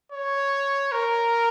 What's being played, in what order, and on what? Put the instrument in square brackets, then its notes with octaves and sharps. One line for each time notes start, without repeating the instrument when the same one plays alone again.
[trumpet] C#5
A#4